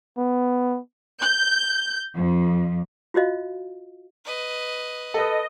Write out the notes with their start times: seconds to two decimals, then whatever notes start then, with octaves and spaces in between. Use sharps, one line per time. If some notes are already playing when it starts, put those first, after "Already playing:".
0.18 B3
1.21 G6
2.14 F2
3.14 F4 F#4 C5 D#5 F5
4.25 B4 D#5
5.14 A4 B4 D#5